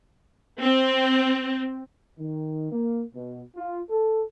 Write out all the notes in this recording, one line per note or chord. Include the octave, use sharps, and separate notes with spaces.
C4
D#3
A#3
B2
F4
A4